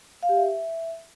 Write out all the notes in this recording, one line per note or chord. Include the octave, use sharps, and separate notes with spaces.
F5
G4
E5